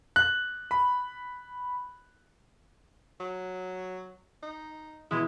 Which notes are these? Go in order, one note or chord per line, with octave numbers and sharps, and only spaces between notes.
F#6
B5
F#3
D#4
B2 E3 G#3 E4